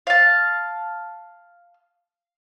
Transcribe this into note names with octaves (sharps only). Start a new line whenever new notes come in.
F5 A5